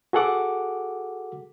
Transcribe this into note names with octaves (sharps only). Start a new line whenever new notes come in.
F#4 G#4 A4 F#5 D6